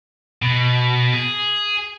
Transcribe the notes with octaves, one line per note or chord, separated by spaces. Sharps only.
B2
G#4